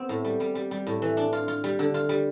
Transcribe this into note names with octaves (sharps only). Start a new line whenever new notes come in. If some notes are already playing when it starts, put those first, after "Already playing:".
Already playing: B3 C4
A2
G3
G3
G3
G3
A2
E3
D4
F4
F4
G3
D3
F4
G3